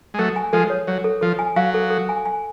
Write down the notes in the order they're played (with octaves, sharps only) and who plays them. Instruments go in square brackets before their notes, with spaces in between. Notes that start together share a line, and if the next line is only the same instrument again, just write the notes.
[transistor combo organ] G#3
[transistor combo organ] F#3 A3 [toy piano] A4
[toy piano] G#5
[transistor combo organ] F3 G#3 [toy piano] A4
[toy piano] C#5
[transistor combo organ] F#3 [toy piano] C#5
[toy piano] A4
[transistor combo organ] F3 [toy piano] A4
[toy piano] G#5
[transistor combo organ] F#3 [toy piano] F5
[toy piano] A4
A4
G#5
G#5